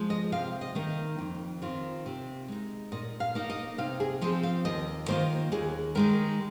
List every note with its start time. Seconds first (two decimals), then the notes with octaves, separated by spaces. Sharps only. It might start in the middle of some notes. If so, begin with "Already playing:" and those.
Already playing: F3 G#3
0.10 D#5
0.32 C3 F5
0.61 D#5
0.75 D#3 A#3 D#4
1.18 F2
1.62 D#3 C4 F4
2.06 C3
2.48 G#3 D#4
2.92 A#2 D#5
3.20 F5
3.35 A#3 D#4
3.50 D#5
3.78 C3 F5
4.00 G#4
4.21 F3 C4 D#5
4.43 F5
4.65 D#2 D#5
5.08 D#3 A#3 F4 C5
5.52 D#2 G#4
5.95 D#3 G#3 D#4 A#4